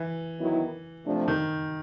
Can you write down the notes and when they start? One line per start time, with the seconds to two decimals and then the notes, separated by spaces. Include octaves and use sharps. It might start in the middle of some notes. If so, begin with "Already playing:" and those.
Already playing: E3
0.39 D#3 F#3 B3 E4
1.06 C3 F3 A3 D4
1.28 D#3